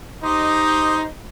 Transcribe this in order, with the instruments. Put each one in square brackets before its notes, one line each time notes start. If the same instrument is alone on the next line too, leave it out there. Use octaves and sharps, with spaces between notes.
[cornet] D#4 [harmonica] G4 C5 D#5